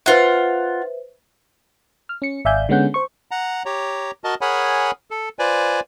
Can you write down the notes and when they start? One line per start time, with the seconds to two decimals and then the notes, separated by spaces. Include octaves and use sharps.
0.06 F4 B4 C5 E5 F#5
2.09 F6
2.22 C#4 C#7
2.45 G#1 D5 E5 F5 G#5 G6
2.69 D3 G#3 B3 C#4 F#5 G6
2.94 C5 C#6
3.31 F#5 A#5
3.66 G4 C#5 A#5
4.24 F#4 A#4 D#5 A5
4.41 G#4 A#4 C#5 F#5 G#5 B5
5.11 A4
5.39 F4 B4 C5 D5 G#5